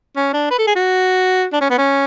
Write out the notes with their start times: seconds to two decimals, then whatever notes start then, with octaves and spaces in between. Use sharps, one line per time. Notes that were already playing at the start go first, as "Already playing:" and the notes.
0.16 C#4
0.34 D4
0.51 B4
0.59 A4
0.67 G#4
0.76 F#4
1.53 D4
1.61 C#4
1.70 B3
1.78 C#4